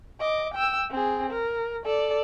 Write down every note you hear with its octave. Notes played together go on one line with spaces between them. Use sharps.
D#5 D6
G5 E6
C4 G#4
A#4
A4 D5